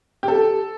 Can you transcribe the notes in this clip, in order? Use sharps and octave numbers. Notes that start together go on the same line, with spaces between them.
G4
A4